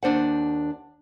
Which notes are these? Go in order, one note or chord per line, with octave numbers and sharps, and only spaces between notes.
D#2 D4 C5 F#5